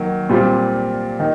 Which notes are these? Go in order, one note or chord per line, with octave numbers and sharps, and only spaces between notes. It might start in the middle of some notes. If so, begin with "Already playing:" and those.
Already playing: D#3 F#3 A#3
A#2 G3 C4 F4
D#3